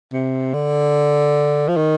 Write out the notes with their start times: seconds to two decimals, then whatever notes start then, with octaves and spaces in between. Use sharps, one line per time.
0.13 C3
0.54 D3
1.69 F3
1.77 D#3